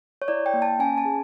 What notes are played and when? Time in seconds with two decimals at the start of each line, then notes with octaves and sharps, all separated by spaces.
0.22 C#5
0.28 E4 D5
0.46 G5
0.54 A#3
0.62 A5
0.79 C#4 G#5
0.98 A5
1.05 G#4